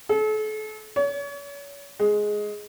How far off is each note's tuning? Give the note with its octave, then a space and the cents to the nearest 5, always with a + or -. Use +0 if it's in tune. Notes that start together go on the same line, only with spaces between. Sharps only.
A4 -40
C#5 +35
G#3 +10